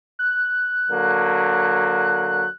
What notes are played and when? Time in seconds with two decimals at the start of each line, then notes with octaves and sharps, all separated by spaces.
0.19 F#6
0.90 D3 F#3 A#3